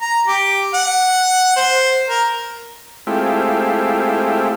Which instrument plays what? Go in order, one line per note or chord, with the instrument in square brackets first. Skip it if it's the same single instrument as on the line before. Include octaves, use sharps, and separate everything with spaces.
[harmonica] A#5
G4
F#5
C5
A#4
[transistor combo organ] G#3 A3 C4 E4 F4 G4